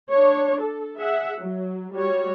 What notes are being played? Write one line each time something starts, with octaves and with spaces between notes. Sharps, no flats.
D4 C#5
A4
G#4 E5 F#5
F#3
G3 F#4 C#5